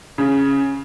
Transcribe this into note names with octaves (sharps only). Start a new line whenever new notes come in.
C#3